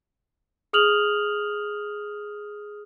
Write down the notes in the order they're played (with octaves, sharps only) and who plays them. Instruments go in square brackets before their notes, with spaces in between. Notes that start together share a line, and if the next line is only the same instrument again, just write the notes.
[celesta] G#4 D#6 F6 F7 F#7